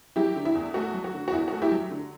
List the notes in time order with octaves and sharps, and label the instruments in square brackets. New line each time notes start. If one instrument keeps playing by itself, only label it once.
[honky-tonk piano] F#3 E4 G4
D3
E4
E2
A3 F#4
F#3
F#4
D3
F#4
E2 E4
A3 F#4
E4 G4
F#3
D3